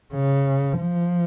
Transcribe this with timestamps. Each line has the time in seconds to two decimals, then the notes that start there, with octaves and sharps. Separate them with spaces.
0.14 C#3
0.79 F3